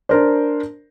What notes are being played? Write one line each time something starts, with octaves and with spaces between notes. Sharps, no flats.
D4 A#4 C5